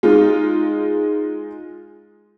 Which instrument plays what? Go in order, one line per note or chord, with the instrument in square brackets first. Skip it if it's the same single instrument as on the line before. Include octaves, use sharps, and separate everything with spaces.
[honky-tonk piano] G#3 D#4 F4